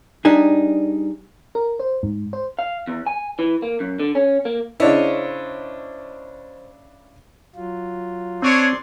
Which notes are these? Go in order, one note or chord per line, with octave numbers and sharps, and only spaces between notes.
G3 D4 D#4 G#4
A#4
C5
G#2
C5
F5
E2
G#5
E3
A#3
F#2
D3
C#4
A#3
C#3 D4 E4 C5 C#5 D#5
F#3 F4
C4 D4 G#4 C#5 D5 C6